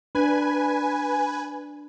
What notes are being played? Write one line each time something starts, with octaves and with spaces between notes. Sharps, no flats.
D4 B4 G#5